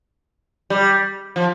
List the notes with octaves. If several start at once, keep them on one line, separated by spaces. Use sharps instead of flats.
G3
F3